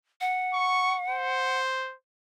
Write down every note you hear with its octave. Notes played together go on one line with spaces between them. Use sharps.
F#5
C#6
C5